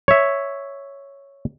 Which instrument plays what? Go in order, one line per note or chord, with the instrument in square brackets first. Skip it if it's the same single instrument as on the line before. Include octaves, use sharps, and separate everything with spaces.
[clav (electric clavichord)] C#5 E5